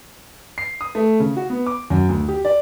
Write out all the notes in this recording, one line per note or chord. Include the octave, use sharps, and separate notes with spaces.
C7
D#6
A3
C#3
F#4
B3
D6
F#2
D2
G4
D5